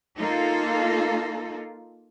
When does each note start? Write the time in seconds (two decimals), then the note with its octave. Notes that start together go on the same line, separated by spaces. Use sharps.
0.18 A#3 D#4 F4 A4